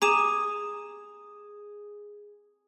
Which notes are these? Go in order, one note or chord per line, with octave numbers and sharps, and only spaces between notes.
G#4 A#5 D6 E7